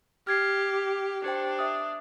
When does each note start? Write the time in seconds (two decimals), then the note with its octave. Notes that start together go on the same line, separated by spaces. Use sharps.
0.27 G4 F6 G#6 C7
1.24 D4 G4 C5 G5
1.59 E5 D#6